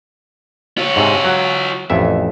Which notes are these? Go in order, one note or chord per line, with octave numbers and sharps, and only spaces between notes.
F4 C#5
G#2 C3
F#3
A1 F2 E5